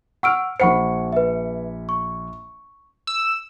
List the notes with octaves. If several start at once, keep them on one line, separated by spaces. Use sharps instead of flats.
F#5 C#6 E6 F6 D7
A#1 C5 F#5 B5 C#6 C#7
B4 E5
C#6
E6